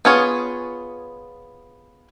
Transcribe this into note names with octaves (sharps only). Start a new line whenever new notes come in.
B3 F4 G#4 C#5